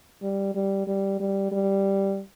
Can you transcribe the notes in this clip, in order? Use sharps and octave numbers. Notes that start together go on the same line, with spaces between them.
G3
G3
G3
G3
G3